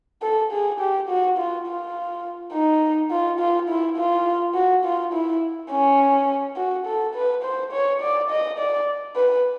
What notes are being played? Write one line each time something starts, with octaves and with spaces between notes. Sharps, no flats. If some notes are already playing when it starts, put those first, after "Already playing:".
A4
G#4
G4
F#4
F4
F4
D#4
F4
F4
E4
F4
F#4
F4
E4
C#4
F#4
A4
B4
C5
C#5
D5
D#5
D5
B4